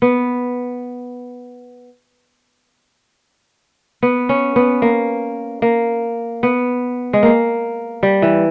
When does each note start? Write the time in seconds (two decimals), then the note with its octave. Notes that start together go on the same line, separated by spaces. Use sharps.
0.02 B3
4.03 B3
4.29 C#4
4.56 B3
4.82 A#3
5.62 A#3
6.43 B3
7.13 G#3
7.23 A#3
8.03 G3
8.22 E3